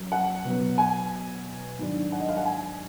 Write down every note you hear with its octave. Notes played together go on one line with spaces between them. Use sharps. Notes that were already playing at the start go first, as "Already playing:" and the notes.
Already playing: F#2
F#5
B2 F#3 B3
G#5
G#2 D#3 F#3 D4
F#5
D#5
F5
F#5
G#5